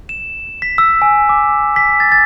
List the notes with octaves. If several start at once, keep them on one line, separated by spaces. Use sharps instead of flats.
E7
B6
E6
G#5
D6
B6
A6
A6